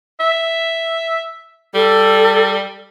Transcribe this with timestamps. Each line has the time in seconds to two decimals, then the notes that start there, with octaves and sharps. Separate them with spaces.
0.20 E5
1.74 G3 A4